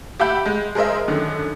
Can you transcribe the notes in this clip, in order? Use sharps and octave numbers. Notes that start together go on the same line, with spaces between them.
G4 E5 F#5 B5 G6
G#3
G#4 A#4 C5 D#5 E5
F#2 D3 D#3